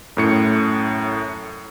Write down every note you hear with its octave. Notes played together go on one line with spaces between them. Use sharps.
F#2 A2 C#7